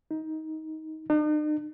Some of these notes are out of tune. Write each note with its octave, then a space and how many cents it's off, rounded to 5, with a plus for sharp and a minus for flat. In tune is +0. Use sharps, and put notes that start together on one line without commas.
D#4 +20
D#4 -45